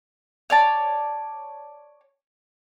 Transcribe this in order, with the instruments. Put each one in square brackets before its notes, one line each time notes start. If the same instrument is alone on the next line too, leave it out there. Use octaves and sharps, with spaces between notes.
[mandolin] C#5 D5 A5